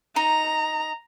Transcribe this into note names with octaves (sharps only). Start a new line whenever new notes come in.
D#4 A#5